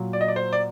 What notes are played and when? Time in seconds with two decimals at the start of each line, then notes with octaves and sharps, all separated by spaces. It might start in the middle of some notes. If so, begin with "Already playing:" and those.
Already playing: A#2 F#3
0.13 D5
0.21 D#5
0.28 D5
0.36 C5
0.53 D5